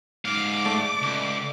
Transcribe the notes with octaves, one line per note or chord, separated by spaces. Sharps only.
G#2 F5 D6
A3 D5
C#2